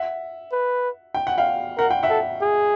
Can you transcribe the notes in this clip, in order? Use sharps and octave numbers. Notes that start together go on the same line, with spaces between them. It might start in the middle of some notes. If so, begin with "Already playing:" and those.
Already playing: E5 F#5
B4
G5
F#5
F5 G5
A#4 F#5
G5
E5 F#5
A4
G#4